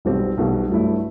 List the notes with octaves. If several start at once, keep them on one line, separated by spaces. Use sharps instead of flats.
B1 B2 G3 C4
B1 B2 G3
G2 F#3 A3 E4